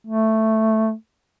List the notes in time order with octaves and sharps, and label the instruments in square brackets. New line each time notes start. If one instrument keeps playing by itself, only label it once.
[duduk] A3